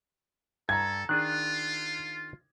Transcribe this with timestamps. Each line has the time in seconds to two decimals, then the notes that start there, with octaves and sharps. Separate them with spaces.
0.69 G2 A4 A#5 G#6
1.09 D#3 D4 F4 G#4 F#6